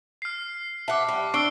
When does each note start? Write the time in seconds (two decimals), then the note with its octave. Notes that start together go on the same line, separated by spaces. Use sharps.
0.22 F6 C7
0.88 E5 F#5 A5 D6
1.08 G3
1.34 D4 C#6 E6 C7 D7 G7